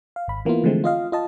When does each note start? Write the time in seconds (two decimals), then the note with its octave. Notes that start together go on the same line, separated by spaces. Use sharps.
0.16 F5
0.28 G#1 B5
0.45 E3 A#3 B3 E4 F4
0.64 D3 E3 F3 G#3 A3 C4
0.84 F4 D#5 F5
1.12 F4 D#5 A5